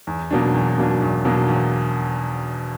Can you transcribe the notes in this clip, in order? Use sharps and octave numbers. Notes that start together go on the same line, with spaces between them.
E2
B2 F#3 A#3 D4
E2
B2 F#3 A#3 D4
E2
B2 F#3 A#3 D4
E2